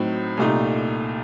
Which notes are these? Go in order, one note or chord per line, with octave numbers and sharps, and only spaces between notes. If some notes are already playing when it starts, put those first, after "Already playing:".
Already playing: A2 F#3 C4 D#4
C2 A#2 A3 D#4